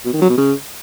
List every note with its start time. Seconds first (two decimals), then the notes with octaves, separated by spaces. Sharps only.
0.05 B2
0.13 D#3
0.22 F#3
0.30 B2
0.38 C#3